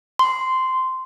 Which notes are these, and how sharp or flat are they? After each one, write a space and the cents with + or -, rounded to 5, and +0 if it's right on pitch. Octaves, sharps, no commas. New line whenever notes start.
C6 -10